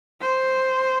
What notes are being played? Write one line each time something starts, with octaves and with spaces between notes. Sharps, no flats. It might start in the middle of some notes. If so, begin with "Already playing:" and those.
C5